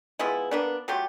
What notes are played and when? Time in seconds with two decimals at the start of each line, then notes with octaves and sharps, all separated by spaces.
0.19 F3 G#3 B3 E4
0.51 A#3 B3 D4
0.88 F#3 A3 F4 G4